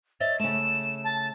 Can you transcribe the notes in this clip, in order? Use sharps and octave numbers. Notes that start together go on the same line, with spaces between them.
C#5 D#5 E5 A6
C#3 A3 E7
A5